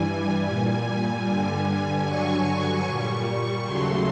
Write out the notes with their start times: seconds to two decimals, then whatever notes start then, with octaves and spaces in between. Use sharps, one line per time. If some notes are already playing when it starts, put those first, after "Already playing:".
Already playing: G2 E3 G3 G#5
0.45 A#2 G3
1.25 G2 D3 G3
2.05 G2 D3 F#3 C#6
2.86 A#2 G3
3.66 D#2 C#3 F#3 A3 C6